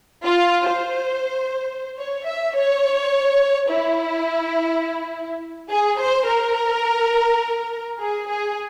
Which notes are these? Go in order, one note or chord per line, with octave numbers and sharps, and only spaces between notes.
F4
C5
C#5
E5
C#5
E4
G#4
C5
A#4
G#4
G#4